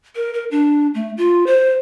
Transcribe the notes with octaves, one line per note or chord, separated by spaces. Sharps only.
A#4
A#4
D4
A3
F4
C5